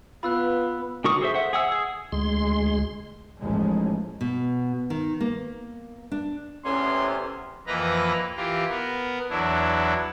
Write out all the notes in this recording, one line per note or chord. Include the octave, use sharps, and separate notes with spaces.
B3 F4 B4 B5 E6 F#6
D3 F#4 A#4 C#6 D#6
G#4 A4 C5 E5
C5 E5 F#5
G#4 F#5 E6
G#4
D2 G#3 C6
A1 D#2 A2 F3 G#3
B2
D#3
A#3
D4
E2 A2 C3 B3 C#4 C6
F2 E3 A#3 B4 D#5 A#5
E3 F4 G4 A#4
B3 A#4
E2 F#3 D4 E4